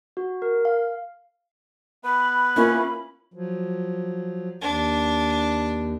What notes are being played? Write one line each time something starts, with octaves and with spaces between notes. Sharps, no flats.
F#4
A#4
F5
B3 B4 B5
A#3 C#4 E4 F4
F3 F#3
D#2 D4